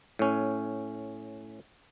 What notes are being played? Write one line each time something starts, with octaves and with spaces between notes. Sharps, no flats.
A2 C#4